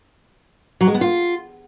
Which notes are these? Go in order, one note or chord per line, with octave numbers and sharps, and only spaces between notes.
F#3
G#3
B3
F4